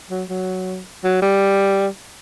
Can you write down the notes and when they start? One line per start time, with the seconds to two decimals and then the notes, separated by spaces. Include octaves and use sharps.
0.10 F#3
0.29 F#3
1.04 F#3
1.22 G3